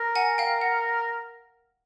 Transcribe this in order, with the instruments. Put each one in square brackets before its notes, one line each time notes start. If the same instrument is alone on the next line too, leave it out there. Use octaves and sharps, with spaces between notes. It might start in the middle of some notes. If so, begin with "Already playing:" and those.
Already playing: [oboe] A#4
[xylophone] F#5 G#5
F5 G5
F#5